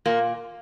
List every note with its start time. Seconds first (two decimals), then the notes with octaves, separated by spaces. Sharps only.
0.05 A#2 A#3